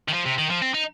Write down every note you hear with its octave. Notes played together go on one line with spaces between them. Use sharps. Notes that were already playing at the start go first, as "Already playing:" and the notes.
D#3
F3
C3
D#3
F3
C4
D#4